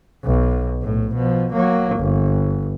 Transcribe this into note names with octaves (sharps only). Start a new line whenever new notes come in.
B1 B2
A#1 A2
B2 F3
F#3 A#3
G1